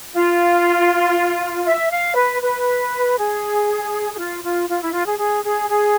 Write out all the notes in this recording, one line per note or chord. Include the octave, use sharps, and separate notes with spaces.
F4
E5
F5
B4
B4
G#4
G#4
F4
F4
F4
E4
F4
G#4
G#4
G#4
G#4